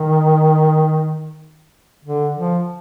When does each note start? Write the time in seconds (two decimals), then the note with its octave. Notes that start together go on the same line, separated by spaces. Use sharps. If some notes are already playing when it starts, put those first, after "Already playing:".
Already playing: D#3
2.04 D3
2.36 F3